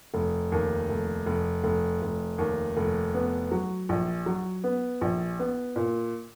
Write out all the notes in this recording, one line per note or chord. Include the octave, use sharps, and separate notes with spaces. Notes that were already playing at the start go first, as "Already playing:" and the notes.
F1
D#2
F1
F1
F1
F1
D#2
F1
B3
F#3
A#1
F#3
B3
A#1
B3
A#2